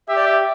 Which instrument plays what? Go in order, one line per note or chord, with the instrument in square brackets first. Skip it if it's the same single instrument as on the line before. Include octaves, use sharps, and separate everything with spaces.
[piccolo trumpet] G4 [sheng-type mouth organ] E5
[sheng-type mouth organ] D5
E5